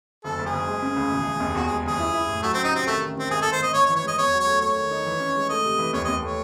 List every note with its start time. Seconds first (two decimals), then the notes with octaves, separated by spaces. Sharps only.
0.24 F#1 A4
0.39 F#1
0.46 G#4
0.53 F#1
0.68 G#3
0.82 C#3
0.96 C#2
1.11 E1
1.26 E1
1.40 D#2
1.55 E2 F#4
1.66 G#3 G#4
1.85 F#1 G#4
1.99 E4
2.13 E4
2.29 A2
2.43 F#3 A3
2.54 C4 C#4
2.64 D#4
2.72 C3 C4
2.86 D#3 A3
3.02 A1
3.16 D#3 C4
3.30 G#1 G#4
3.42 G#1 A4
3.52 C5
3.59 G#1 D#5
3.74 G#1 C#5
3.86 C#5
3.89 E3
3.96 C#5
4.04 G#3 D#5
4.18 E2 C#5
4.33 F#3
4.40 C#5
4.47 A3
4.61 A3 C#5
4.76 D#3
4.91 D#4
5.06 E3
5.20 C#4
5.35 G#3
5.49 A3 D#5
5.64 C3
5.78 E3
5.93 D#2 C#5
6.04 D#2 D#5
6.22 A3 C#5